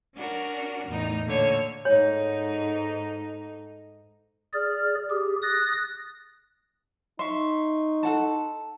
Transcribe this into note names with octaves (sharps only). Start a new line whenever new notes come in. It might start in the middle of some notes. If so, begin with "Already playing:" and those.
C#4 D4 F#4 A#4
E2 A2 D#4
A#2 D3 C#5 E6
G#2 D#4 A4 C#5
G#4 D5 F6
G4 G#4
D#6 F#6 A6 A#6
D#4 E5 C6 C#6
A4 F#5 A5